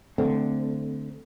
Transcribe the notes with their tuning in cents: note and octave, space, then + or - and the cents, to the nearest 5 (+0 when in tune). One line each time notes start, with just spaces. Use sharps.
D3 +0 A3 -5 C4 -25